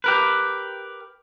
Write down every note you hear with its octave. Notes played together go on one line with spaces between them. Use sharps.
G4 A#4 B4